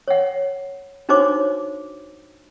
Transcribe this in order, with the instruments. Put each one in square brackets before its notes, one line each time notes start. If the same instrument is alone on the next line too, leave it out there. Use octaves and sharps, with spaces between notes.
[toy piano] C#5 F#5
D4 D#4 F#4 C5 C#5 D6